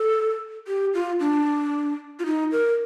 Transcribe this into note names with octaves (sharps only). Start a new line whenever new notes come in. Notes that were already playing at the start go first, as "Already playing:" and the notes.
Already playing: A4
G4
F4
D4
F4
D#4
A#4